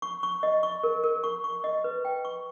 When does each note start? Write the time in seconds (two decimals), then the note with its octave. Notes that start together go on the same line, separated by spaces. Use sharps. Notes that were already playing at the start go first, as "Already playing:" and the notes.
0.02 C#6
0.23 C#6
0.43 D#5
0.63 C#6
0.83 A#4
1.04 A#4
1.24 C#6
1.44 C#6
1.64 D#5
1.84 B4
2.05 G5
2.25 C#6